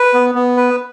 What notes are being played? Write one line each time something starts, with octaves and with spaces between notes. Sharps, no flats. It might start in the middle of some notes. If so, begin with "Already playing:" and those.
Already playing: B4
B3
B3
B4